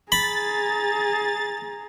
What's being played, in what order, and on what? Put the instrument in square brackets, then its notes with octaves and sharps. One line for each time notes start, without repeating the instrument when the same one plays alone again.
[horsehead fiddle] G#4 A#5 [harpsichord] B5 [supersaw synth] A6